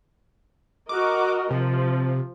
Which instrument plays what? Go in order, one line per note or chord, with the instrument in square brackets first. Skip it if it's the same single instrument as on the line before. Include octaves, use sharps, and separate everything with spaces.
[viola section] F#4 A#4 D#5 [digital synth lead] D6
[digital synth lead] C3 [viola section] F3